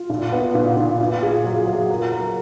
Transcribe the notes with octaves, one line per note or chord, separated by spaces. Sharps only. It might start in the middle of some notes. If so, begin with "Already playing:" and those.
Already playing: F4
A#2
B3
A#2
A#2
F4
G#4
F#3
F#3
A#4
A#4